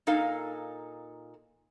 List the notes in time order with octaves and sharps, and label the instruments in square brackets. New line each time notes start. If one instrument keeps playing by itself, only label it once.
[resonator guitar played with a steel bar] A#2 D#4 A4 F5